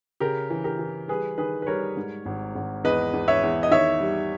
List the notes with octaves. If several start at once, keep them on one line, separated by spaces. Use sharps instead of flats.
C#3 G4 A#4
E3
G4 A#4
E3
G3 G#4 B4
D#3 G#4 B4
B4
G3 A#4 C#5
G#2
G#1
G#1
E2 B4 D#5
E2
C#5 E5
E2
D#5
D#3 C#5 E5
G3